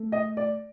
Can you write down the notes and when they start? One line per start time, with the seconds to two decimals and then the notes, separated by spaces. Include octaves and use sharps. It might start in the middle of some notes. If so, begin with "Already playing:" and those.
Already playing: A3
0.12 D#5
0.37 D5